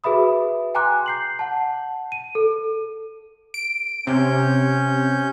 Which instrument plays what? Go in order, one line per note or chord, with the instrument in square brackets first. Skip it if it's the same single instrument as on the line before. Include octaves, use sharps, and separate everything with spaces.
[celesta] F#4 G#4 B4 E5 B5 D#6
G5 G#5 A#5 C6 D6 F#6
G6 C7 F#7
F#5 A5
D#7
A4
[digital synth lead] D7
[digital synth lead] C3 [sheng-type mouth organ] C#4 G6